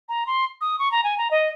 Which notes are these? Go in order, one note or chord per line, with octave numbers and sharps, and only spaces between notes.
A#5
C6
D#6
C#6
A#5
G#5
A#5
D#5